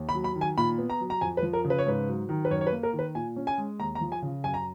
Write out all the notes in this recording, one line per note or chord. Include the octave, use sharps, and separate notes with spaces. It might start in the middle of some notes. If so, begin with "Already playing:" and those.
Already playing: D#2
B5
F#3
B5
D#3
G#5
A#2 B5
B3
A#5
F#3
A#5
F2 G#5
B4
F3
A#4
C#3
B4
C#5
G#2 B4
F#3
D#3
B4
F#2 C#5
C#5
B4
A#3
A#4
D#3
B4
A#2 G#5
C#4
G#5
G#3
D#2 A#5
A#5
F3
G#5
C#3
F#2 G#5
A#5